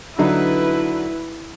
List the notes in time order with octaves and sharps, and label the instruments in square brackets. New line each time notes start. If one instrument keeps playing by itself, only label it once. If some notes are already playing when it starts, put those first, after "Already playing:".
[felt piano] D3 F#3 D#4 [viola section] E4 B4